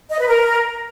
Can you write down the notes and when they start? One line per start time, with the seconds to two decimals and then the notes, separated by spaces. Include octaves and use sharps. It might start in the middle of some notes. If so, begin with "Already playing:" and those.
0.11 D#5
0.19 B4
0.28 A#4